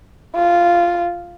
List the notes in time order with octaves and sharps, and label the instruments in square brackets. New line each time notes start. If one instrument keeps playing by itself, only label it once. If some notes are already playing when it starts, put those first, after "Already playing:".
[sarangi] F4